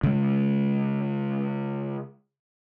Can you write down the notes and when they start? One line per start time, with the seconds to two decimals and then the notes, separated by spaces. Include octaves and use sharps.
0.03 C#3 G#3